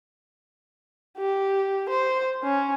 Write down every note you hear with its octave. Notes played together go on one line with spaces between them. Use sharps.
G4
C5
C#4